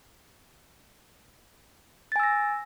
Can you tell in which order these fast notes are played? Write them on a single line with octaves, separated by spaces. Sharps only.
A6 G#5 E6 A#6